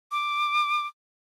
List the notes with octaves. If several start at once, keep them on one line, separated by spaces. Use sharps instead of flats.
D6